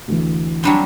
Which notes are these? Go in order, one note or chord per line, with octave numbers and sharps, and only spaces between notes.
D2 E3
F#3 G3 C4 D4